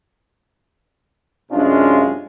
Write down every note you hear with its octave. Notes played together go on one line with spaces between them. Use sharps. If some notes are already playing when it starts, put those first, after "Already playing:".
F#2 C3 G#3 C#4 D4 F4